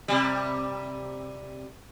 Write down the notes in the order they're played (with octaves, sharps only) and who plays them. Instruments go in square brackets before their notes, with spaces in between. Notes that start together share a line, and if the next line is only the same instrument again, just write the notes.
[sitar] C3 G3